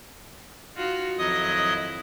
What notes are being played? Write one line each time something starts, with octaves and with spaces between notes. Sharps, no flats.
D#4 F4 F#4
F2 D#3 F#3 E4 D#5 D#6